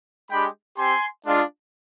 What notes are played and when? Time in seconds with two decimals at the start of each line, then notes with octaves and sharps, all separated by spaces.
0.30 G#3 D4 G4 G5 B5
0.77 C4 G4 G#5 C6
1.25 G#3 D4 F4